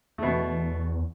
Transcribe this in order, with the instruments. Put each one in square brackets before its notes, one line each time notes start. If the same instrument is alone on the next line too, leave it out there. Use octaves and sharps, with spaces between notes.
[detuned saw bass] E2 [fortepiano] B2 A3